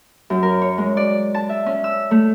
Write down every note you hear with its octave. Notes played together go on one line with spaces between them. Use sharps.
F#2
A#4
C#5
G#3
D5
A5
E5
C#4
E6
A3